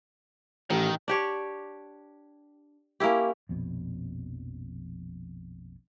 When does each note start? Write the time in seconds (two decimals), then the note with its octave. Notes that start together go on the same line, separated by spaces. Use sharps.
0.70 A1 D#3
1.08 D4 G4 C#5
3.00 A#3 C#4 E4 G4
3.49 A#1 F2 B2